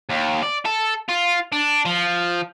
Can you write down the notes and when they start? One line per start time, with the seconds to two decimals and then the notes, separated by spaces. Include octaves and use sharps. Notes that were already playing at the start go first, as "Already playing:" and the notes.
0.09 D#2
0.42 D5
0.65 A4
1.09 F4
1.52 D4
1.85 F3